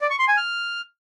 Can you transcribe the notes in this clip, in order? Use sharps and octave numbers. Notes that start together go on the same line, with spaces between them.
D5
C#6
C6
G#5
F6